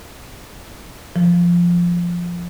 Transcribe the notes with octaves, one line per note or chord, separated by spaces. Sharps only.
F3